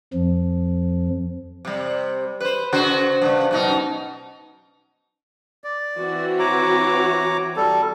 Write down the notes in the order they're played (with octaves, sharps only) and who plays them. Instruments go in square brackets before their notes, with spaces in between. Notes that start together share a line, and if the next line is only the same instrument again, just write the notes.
[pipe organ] F2 F3
[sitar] C3 G3
B4 C5
C#3 F#4 C5
G2 A#2 C#3
F#2 B2 D#4
[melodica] D5
[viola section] E3 C4 F#4
[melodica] C#5 A#5 D6
G3 A4